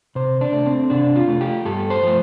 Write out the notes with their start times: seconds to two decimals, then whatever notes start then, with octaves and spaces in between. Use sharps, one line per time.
0.15 C3 C5
0.41 D4
0.53 A3
0.66 C4
0.90 C3 D4
1.16 F4
1.28 A3
1.41 G4
1.65 G2 A4
1.90 C5
2.03 F3 A3